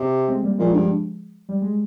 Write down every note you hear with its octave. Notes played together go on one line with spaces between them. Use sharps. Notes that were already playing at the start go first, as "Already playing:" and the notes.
Already playing: C3
G#3 C4
G3 A#3
A#2 F3 G#3
G2
G3
G#3